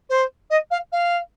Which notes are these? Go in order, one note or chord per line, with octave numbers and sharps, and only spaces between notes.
C5
D#5
F5
F5